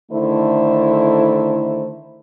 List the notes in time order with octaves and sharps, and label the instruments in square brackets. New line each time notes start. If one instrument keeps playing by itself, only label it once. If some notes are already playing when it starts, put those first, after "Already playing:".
[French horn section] D3 D#3 A3 E4 C5